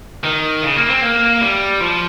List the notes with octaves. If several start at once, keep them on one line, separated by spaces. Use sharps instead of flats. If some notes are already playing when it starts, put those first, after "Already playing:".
D#3
C#3
A#3
C4
A#3
G3
F3